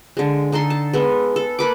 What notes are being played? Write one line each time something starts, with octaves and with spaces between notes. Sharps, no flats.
D3 G#3
D3 D#4 A4 C6
A5
G#3 B3 A4
A4
A#3 B4 D6